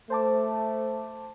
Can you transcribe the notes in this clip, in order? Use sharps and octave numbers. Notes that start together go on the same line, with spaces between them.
A3 C5 A5 D6